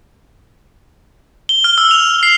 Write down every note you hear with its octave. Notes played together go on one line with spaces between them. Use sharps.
G7
F6
E6
F7
C7